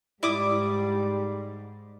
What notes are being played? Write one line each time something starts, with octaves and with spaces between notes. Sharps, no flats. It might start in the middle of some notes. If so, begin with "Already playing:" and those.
G#2 G3 E4 D5 D6 D#6